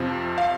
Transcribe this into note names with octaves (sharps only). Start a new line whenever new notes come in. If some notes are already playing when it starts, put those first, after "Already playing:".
Already playing: F2 C3 F3
F5